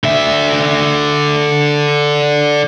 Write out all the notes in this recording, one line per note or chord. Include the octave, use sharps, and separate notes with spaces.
D3 E5